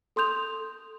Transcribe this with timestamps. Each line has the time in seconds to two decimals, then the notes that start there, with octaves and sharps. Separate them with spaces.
0.16 A4 C6 D#6 G6 F7